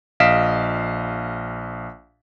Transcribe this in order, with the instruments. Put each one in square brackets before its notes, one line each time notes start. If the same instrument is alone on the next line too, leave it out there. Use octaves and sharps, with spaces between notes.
[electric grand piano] A#1 D#5 F5 B6 D7 E7